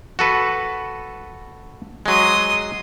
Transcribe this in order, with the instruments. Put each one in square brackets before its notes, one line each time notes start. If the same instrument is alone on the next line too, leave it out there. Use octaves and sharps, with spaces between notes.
[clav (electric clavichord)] F#4 A4 B4
[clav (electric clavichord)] F#3 G#3 [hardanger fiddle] C6 D#6